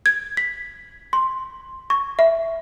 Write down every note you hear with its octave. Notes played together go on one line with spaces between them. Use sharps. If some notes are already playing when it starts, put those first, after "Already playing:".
G#6
B6
C6
C#6
E5